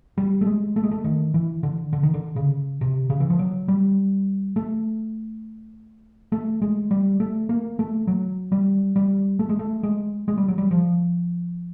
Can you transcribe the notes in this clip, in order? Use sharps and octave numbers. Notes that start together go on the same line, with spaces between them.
G3
A3
G#3
A3
G#3
A3
D#3
E3
D3
D3
D#3
D3
C#3
C3
C#3
E3
F3
F#3
G3
A3
A3
G#3
G3
A3
A#3
A3
F#3
G3
G3
A3
G#3
A3
G#3
G#3
G3
F#3
G3
F3